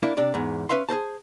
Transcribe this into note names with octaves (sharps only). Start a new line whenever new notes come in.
A#3 D4 E4
C3 D4 D5
E2 G#2
C#4 B4 E5 F5 C6
G#4 A#4 C5 A5